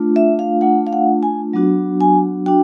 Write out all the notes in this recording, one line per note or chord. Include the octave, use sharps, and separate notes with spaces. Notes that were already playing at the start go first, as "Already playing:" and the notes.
Already playing: A3 D4 F4
E5
F5
A3 D4 F4 F#5
F5
F#5
G#5
F#3 B3 D4 F#4
G#5
D4 F#4 G5